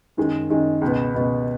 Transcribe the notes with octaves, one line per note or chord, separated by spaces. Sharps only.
F#2 D#3 G#3
F#2 D#3 G#3
C#2 B2 B3
C#2 B2 B3